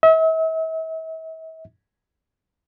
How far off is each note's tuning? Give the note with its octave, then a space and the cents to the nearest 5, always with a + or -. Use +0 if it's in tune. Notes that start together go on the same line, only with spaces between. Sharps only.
E5 -40